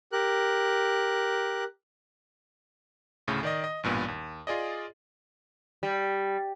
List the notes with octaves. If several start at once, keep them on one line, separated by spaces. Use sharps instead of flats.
G4 A#4 F#6
D2 A2 C#3 A3
D#3 D5 D#5
D#5
A1 G2 A#2 B3
D#2
F4 G#4 D5 D#5
G3